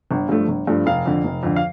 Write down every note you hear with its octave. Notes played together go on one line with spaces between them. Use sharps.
G1
G2 F3 A3
G1
G2 F3 A3
F1 F5
F2 D3
F1
F2 D3
F5